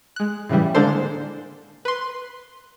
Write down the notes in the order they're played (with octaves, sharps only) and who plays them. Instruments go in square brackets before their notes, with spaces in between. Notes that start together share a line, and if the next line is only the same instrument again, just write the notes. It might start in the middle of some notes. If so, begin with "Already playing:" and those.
[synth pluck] G#3 F#6
A2 C#3 E3 G3
D3 G#3 A#3 D4 A4 C5
B4 C6